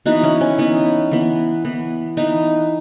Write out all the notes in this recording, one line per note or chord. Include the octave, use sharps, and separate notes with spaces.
E3 B3 D#4 F#4
C#4 E4
C#4
E3 B3 D#4
E3 B3
E3 B3
E3 B3 D#4